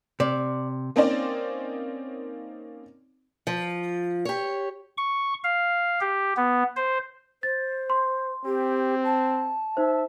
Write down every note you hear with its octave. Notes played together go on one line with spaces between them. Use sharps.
C3 D5
A#3 C4 C#4 D#4 C5 D5
F3
G4 C#5
C#6
F5
G4
B3
C5
C5 A6
C6
C4 G4
A5
D#4 C5 E5